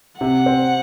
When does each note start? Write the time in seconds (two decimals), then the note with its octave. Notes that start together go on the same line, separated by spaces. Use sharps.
0.21 C3 F#5
0.46 C4